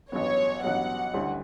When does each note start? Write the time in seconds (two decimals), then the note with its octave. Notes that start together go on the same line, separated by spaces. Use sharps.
0.11 A1 G2 F#3 B3 C#5
0.63 A1 G2 F#3 B3 F#5
1.14 D2 D3 G3 C#4 E4